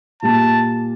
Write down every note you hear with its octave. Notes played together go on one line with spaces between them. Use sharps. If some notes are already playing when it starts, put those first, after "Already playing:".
A#2 G3 A#3 A5